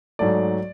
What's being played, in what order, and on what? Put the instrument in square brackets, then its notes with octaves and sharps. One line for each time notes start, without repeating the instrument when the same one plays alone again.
[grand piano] G#2 F#3 A3 D5